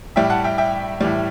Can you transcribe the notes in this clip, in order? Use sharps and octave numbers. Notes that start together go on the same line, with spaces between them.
A2 G3 E5 G5
F#5 A5
E5 G5
E5 G5
A2 E3 G3